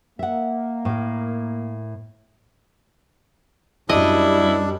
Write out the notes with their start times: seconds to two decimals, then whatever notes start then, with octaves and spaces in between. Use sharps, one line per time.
0.19 A#3 E5 F#5
0.85 A2 A#4
3.89 F#2 G3 D4 E4 D#5